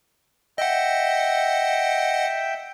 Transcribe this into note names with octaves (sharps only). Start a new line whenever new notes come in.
D#5 E5 F#5 G5